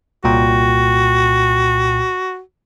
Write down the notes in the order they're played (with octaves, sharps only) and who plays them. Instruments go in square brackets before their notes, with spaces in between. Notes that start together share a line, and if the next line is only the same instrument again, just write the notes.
[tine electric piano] C2 A#2 G5 [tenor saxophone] F#4